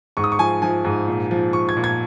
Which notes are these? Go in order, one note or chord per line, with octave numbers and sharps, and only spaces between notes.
G#2 C#6
D#6
C#6
F3 G#5
F3 G#5
G#2
A#2
F3
F3 C#6
G#6
A#2
G#6